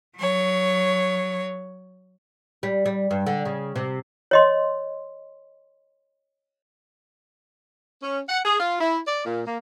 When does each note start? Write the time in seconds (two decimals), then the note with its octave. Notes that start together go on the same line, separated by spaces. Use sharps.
0.17 F#3 C#5
2.63 G3
2.86 G3
3.11 G2
3.27 D3
3.45 C#3
3.76 C3
4.31 C#5 D#5 C6
8.03 C#4
8.29 F#5
8.45 G#4
8.59 F4
8.81 E4
9.07 D5
9.26 A#2
9.46 A#3